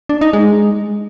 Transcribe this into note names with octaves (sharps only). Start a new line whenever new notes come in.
D4
D#4
G#3